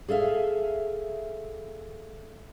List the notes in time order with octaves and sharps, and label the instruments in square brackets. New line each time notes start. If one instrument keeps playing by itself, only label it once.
[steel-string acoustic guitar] G#4 A4 E5 F5